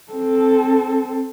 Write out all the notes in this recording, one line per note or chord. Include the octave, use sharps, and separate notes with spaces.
C4 A4